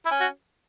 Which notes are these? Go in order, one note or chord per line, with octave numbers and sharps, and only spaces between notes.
E4
C#4
F#4